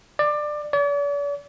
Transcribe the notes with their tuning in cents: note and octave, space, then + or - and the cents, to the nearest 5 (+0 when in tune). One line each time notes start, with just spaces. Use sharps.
D5 +20
D5 -45